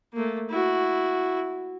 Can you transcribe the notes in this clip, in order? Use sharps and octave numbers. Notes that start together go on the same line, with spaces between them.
A3 A#3
E4 F#4